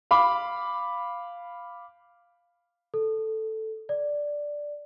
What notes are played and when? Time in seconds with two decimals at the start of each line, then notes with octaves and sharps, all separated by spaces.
0.11 F5 B5 D6
2.94 A4
3.89 D5